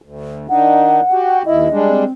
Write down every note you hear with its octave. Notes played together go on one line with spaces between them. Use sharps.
D2
D#3 D4 D#4 F#5
F#4 G4
D#2 E4 D#5
G3 G#3 D4
C4